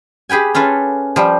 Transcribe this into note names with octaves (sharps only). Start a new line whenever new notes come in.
G4 G#4 B4 G5 G#5
C#4 F4 A4 B4
F3 G3